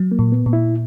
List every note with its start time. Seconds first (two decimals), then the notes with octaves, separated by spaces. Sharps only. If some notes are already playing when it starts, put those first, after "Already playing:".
Already playing: F#3
0.12 A#3
0.19 A#2
0.32 B3
0.46 A#2
0.53 E4